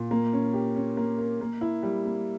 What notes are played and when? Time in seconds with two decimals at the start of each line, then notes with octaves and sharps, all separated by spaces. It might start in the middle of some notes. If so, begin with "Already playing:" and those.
Already playing: A#2
0.11 A#3
0.33 C#4
0.54 G4
0.76 C#4
0.97 A#3
1.18 A#4
1.41 A#3
1.61 E4
1.83 G3
2.05 A#3